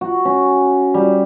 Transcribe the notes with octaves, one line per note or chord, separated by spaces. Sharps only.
F#4
C#4
G3